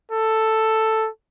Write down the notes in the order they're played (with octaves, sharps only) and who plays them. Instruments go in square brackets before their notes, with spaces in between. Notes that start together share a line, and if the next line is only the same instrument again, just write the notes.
[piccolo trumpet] A4